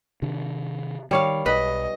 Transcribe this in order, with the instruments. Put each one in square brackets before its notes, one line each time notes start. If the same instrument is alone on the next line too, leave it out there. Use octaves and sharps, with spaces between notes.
[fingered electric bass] C3 D#3 D4
[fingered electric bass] D#3 [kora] G3 C#5 F5
[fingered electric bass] B1 [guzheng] B4 [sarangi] D#5